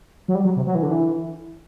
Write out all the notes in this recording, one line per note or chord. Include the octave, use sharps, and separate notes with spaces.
F#3
G3
F#3
C3
F#3
E3
D3
E3